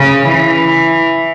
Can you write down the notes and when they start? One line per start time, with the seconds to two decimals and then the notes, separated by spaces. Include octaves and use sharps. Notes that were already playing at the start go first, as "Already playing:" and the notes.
Already playing: C#3
0.27 E3